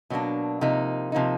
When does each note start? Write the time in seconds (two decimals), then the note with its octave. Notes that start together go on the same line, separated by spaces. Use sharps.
0.10 B2 F#3 A#3 D4
0.61 C3 F3 A#3 D#4
1.12 C3 F3 A#3 D#4